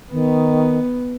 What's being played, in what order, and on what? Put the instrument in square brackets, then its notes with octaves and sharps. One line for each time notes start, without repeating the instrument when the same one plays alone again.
[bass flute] D#3 [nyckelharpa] B3